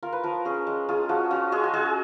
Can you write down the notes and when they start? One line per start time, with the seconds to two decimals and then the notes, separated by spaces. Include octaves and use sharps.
0.03 F4 A#4
0.13 B4
0.24 F3 A#4
0.45 C#4 G#4
0.67 G#3
0.89 F4 G#4
1.09 F3 F#4
1.31 C#4 F#4
1.52 G#3 G#4
1.64 F#4
1.74 G#3 G#4